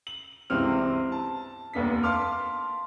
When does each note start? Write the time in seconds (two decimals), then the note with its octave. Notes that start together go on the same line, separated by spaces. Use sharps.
0.07 F#7
0.50 G1 C#2 C3 E3 C4 F6
1.12 A5
1.73 F1 D#2 B3 D4 B6
2.03 F5 A5 C6 D6 F6